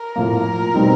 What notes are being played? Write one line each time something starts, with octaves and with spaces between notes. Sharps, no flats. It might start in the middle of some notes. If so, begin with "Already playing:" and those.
Already playing: A#4
A2 F3 A#3
B2 G3 C4 D#4